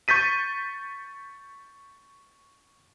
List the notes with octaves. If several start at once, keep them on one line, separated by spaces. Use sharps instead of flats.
C#6 G6 A6 B6 D#7